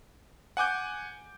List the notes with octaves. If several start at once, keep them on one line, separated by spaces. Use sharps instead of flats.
F#5 G#5 D6 G6